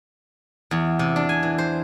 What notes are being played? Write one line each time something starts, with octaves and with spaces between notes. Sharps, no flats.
E2
C3
D4
G#5
E3
C5